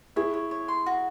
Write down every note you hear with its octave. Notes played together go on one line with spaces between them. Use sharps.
E4 G#4 C#5
C#5
C#5
C6
F#4